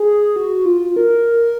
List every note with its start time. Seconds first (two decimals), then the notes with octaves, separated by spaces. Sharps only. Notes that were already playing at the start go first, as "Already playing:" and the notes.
Already playing: G#4
0.36 F#4
0.65 F4
0.96 A#4